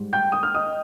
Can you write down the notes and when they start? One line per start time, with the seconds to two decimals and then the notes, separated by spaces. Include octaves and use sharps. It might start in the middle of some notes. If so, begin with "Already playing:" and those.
Already playing: G#2 G3
0.13 G5 G6
0.32 D#6
0.43 F6
0.54 D#5 D#6